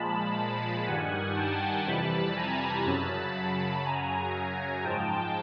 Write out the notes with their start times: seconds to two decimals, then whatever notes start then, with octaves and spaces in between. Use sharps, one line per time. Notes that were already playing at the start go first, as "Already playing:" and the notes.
Already playing: A#2 F3 G#3 A5 B5
0.86 G2 D#3 G3 F#5 G#5
1.36 G5 A5
1.86 F2 C3 E3 G3 A5 B5
2.36 G#5 A#5
2.85 F#2 C#3 F#3 A5 B5
3.35 A5 B5
3.85 F#2 C#3 F#3 G#5 A#5
4.84 G#2 F3 G#3 G5 A5